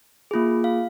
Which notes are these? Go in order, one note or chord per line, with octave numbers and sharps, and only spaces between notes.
A#3 F4 G#4
F5